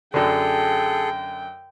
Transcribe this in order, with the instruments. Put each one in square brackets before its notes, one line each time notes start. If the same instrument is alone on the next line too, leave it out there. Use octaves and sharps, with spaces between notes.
[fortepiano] F#2 D3 [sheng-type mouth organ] G#4 A4 [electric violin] G5